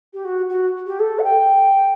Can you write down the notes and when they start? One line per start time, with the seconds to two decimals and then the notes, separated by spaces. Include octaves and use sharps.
0.13 G4
0.25 F#4
0.49 F#4
0.86 G4
0.99 A4
1.19 F#5
1.24 G5